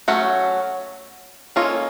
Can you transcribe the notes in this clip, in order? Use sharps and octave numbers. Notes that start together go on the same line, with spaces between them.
F#3 A3 C#4 F#4
A#3 C#4 F4 A4 D#5